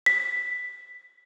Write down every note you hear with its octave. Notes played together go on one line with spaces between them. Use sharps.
B6